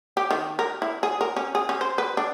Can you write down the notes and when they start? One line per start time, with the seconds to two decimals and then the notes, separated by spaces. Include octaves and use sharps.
0.17 G4
0.31 D#3
0.59 A#4
0.82 E4
1.03 G#4
1.21 A#4
1.37 C#4
1.55 G#4
1.69 C#4
1.81 C5
1.98 B4
2.17 D4